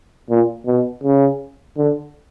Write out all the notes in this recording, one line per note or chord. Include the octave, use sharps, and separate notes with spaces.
A#2
B2
C#3
D3